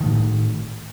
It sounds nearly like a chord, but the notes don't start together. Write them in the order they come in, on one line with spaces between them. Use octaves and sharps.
D#3 A3 A2